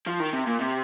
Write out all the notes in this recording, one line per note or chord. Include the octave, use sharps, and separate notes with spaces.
F3
D#3
C3
A#2
C3